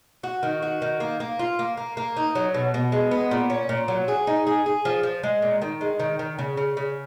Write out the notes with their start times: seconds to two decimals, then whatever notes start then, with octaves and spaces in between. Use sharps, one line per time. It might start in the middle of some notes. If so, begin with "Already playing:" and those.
0.23 F#4
0.43 D#3
0.62 F#4
0.82 D#3
1.00 A#3
1.20 A#3
1.39 F4
1.59 A#3
1.77 A#3
1.97 A#3
2.17 D#4
2.35 F#3
2.54 B2
2.74 B2
2.92 G#3
3.11 B3
3.31 A#2
3.50 C#4
3.69 A#2
3.88 F#3
4.08 G#4
4.27 D#4
4.47 G#4
4.66 G#4
4.85 F3
5.03 F3
5.23 G#3
5.42 A#2
5.62 D#3
5.81 G#3
5.99 D#3
6.19 D#3
6.38 C#3
6.57 C#3
6.77 C#3